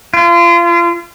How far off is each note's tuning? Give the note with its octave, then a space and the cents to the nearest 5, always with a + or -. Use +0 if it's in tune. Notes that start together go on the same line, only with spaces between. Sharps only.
F4 -35